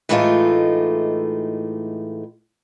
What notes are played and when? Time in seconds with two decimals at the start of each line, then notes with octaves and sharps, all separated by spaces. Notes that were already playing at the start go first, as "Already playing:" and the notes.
0.09 A2 E3 G#3 A3 D#4 F4